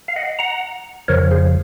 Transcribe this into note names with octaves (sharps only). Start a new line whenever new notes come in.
F5
D#5 F#5
F#5 A#5
F2 C#3 F3 A#4 C#5
G#4 C5